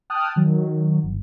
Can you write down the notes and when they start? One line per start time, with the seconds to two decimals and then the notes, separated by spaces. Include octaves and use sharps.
0.10 G5 A5 D#6 F6 F#6
0.36 D#3 F#3
1.03 G1